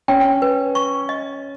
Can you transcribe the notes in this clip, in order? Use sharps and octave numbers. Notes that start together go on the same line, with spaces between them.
C#4 G5
B4
C#6
D#5